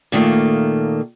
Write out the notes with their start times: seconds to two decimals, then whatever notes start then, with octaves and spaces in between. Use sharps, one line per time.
0.12 A#2 D#3 F3 A3 A#3